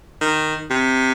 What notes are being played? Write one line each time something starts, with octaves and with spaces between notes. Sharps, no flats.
D#3
C3